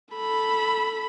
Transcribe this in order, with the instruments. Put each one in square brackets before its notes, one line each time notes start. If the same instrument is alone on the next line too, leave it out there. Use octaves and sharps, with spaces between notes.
[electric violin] A4 B5